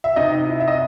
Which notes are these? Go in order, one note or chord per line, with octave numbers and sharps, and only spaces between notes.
E5
C3 D#4 D#5
E4
E5
D#5